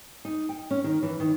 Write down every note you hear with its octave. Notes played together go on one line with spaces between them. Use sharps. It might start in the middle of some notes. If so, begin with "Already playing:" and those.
D#4
G5
C#4
D#3
E3
D#3